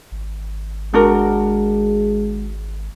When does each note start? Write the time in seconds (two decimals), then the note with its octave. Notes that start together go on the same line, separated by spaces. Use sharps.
0.12 G#1
0.94 G#3 D4 F#4 A#4